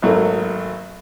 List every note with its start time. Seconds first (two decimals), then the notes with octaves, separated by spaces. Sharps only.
0.02 G#1 F#3 A3 A#3